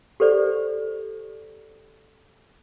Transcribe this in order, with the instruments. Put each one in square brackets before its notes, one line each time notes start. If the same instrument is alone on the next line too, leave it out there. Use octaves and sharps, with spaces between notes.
[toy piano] G4 A4 C5 D5